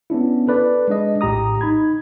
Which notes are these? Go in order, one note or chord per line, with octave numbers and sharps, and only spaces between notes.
B3 C#4 D4 E4
A4 B4 D5
G#3 D4 D#5
A#1 A2 G4 A#5 D#6
D#4 B5 G#6